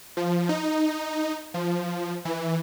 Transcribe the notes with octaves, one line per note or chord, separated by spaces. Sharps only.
F3
D#4
F3
E3